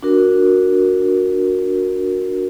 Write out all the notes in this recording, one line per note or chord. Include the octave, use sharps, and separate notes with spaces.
D4 F#4 A#4